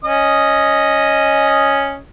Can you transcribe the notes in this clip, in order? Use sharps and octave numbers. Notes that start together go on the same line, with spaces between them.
C#4 D#5 D#6